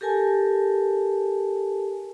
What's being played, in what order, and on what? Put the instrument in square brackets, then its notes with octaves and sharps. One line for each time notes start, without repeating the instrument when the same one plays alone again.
[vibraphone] G4 A4 A#4 G#5 A5